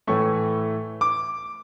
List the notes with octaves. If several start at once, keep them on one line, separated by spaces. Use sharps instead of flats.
A2 E3 A3 C#6
D6